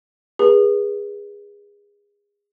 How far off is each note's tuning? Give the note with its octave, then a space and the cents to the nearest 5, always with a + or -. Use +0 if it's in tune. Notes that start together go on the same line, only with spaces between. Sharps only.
G#4 -25 B4 -30